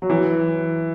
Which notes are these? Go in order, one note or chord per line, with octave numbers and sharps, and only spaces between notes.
F#3
E3